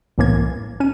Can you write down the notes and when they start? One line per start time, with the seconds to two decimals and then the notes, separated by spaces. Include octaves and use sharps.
0.18 C2 A2 E3 A#3 G#6
0.80 C#4 D#7